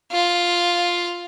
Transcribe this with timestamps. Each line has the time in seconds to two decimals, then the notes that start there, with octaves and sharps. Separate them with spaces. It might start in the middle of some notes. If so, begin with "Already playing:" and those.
0.12 F4